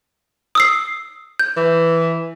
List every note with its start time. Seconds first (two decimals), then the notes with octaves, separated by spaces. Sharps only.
0.55 D#6 E6 C7
1.39 G6
1.57 E3